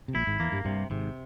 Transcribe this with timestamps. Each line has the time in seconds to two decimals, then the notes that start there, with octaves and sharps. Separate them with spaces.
0.08 C3
0.14 A#1 A#2 E4
0.27 G#1 G#2
0.40 E2 E3 A#3
0.52 G2 G3
0.65 G2 C3 G3
0.90 G#1 G#2 C3